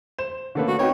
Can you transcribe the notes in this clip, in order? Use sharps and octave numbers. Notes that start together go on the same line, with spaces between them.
C5 E7
D3 A3 A#3 C#4 A4 B4
F#4
C4 D#4 F#4 B4 C#5 G5